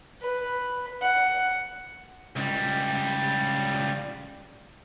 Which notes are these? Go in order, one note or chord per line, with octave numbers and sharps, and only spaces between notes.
B4
F#5
C#2 G3